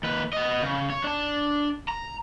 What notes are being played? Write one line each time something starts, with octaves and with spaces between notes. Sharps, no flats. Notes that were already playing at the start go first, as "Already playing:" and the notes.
D#2 B4
B3 D#5
C#3
C#5
D4 A5
A#5